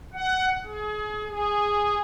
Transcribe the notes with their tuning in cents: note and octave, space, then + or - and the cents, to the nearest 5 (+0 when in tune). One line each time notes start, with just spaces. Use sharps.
F#5 +15
G#4 +30
G#4 -10